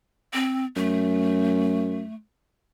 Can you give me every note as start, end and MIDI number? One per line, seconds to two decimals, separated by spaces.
0.33 0.65 60
0.76 2.03 42
0.76 2.15 57